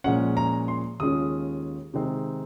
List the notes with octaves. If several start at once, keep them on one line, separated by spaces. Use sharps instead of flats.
A#2 F3 G#3 C#4 F#5
A#5
C6
D#2 C#3 G#3 C#4 F4 D#6
C3 D#3 G#3 C4 D#4